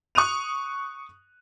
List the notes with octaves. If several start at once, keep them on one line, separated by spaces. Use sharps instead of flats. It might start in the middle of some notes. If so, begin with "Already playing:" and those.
C#6 D#6 F#6 D#7 F7